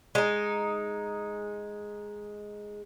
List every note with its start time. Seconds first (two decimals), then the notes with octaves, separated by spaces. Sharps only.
0.15 G#3 D#4